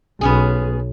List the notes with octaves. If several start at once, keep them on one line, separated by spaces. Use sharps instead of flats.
B1 B3 C#4 G#4